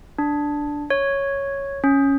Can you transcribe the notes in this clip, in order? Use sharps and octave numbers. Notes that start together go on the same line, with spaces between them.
D4
C#5
C#4